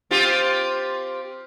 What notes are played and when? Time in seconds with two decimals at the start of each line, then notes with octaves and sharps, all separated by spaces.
0.11 C4 F4 G4